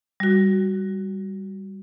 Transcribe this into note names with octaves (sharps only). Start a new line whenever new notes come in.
G3 F#4